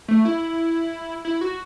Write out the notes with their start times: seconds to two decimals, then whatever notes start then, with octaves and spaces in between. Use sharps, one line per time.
0.08 A3
0.25 E4
1.25 E4
1.41 F#4